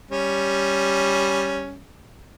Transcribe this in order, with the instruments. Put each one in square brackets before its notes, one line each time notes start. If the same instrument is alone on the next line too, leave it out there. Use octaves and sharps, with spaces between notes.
[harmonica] G3 C#4